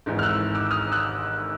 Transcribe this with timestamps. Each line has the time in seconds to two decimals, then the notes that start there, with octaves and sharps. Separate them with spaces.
0.06 G#1 G#2 E3
0.19 F6
0.23 E6 F#6
0.55 D6 E6
0.71 D#6 F6
0.92 E6 F#6